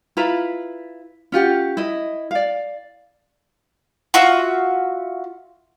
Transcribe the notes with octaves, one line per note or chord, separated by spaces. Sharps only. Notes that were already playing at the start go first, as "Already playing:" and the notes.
E4 F4 B4 A#5
C#4 F4 G4 F#5
E4 D#5
D5 F5
F4 F#4 E5